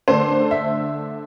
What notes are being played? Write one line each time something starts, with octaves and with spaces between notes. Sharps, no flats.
D3 A3 D4 C5
E5